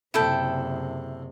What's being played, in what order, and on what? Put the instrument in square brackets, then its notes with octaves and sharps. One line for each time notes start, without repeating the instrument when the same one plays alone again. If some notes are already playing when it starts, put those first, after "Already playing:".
[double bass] F#1 C3 [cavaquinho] E4 A4 G5